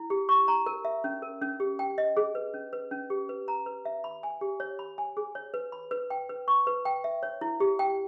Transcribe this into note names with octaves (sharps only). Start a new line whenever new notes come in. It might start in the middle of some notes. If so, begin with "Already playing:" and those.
Already playing: E4
G4
C#6
A#5
A#4
E5
C#4
A#4
C#4
G4
G5
D#5
G#4
B4
C#4
B4
C#4
G4
B4
A#5
B4
E5
B5
G#5
G4
C#5
B5
G#5
G#4
C#5
B4
B5
B4
G5
B4
C#6
B4
G5
E5
C#5
E4
G4
G5